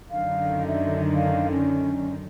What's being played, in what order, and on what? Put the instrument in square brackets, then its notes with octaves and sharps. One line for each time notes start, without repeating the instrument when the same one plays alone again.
[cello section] F#2 D3 D#3 [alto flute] F5
[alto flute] E5
F5
C#4